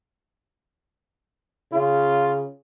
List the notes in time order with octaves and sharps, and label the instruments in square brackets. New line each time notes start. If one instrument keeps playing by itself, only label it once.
[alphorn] C#3 [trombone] F4